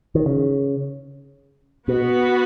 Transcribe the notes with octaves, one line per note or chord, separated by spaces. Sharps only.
D#3
C#3
B2 B3 F#4 B4